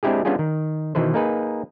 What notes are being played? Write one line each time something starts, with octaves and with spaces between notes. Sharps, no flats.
G#3 C4 D4 E4 G4 G#4
G3 B3 C#4 D4 F4 G#4
D#3
B2 D#3 E3 B4 C5
A#3 D#4 G#4 B4